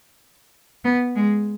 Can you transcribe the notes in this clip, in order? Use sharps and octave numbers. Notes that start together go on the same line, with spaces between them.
B3
G#3